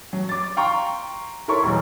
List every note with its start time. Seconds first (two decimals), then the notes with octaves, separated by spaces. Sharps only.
0.13 F#3
0.29 D6 A6
0.57 F5 G5 A#5 C6 C#6
1.48 E4 A4 A#4 C#5 C6 C#6
1.63 E1 B1